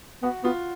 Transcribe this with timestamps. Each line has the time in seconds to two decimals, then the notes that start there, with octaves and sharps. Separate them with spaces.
0.23 B3 F#4
0.44 B3 F4